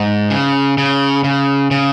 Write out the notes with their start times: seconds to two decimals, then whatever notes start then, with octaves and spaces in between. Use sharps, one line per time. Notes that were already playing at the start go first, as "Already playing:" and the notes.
Already playing: G#2
0.30 C#3
0.78 C#3
1.24 C#3
1.71 C#3